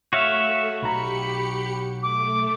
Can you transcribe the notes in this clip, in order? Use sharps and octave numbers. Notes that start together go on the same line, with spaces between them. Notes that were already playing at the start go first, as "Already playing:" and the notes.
A3 F#4 C#5 E5 F5
B1 G4 A#5 B5 C#7
A3 D6